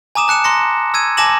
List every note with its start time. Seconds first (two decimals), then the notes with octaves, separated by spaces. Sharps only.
0.15 G#5 A#5 D6 D#6 E7
0.28 A5 F#6 C#7 E7
0.44 A#5 C6 A#6 C#7
0.94 E6 G#6 D#7
1.17 G#5 A5 D6 A#6 E7 F#7